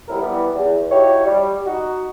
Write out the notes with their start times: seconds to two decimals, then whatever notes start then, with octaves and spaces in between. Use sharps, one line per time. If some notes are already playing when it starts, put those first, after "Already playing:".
0.08 C2 A2 G3 B3 E4 A#4
0.21 E3 G3 B3
0.55 E2
0.90 D#4 E4 F#4 G4 C#5
1.25 G3
1.65 D#4 F#4